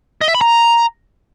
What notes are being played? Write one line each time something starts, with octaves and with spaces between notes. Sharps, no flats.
D#5
E5
B5
A#5